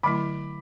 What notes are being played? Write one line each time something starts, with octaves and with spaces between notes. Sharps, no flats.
D3 F#3 A3 E4 B5 D6